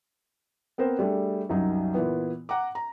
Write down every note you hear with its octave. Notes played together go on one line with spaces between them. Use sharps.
B3 C4 A#4 C5
G3 A3 D4 G#4
C2 F#2 F#3 D#4
A#2 E3 B3
F#5 A#5 D6
A#5